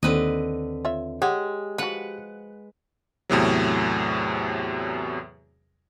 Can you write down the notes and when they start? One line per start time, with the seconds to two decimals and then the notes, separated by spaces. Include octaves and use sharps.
0.03 D#2 D3 C4 B4 D#5
0.85 F4 C#5 E5
1.22 G#3 G4 C#5 F#5
1.78 F3 F#4 B4 F#5
3.29 E2 A2 C3 F#3